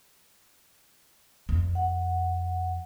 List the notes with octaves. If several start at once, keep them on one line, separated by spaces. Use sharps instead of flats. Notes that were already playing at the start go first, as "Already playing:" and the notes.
F2
F#5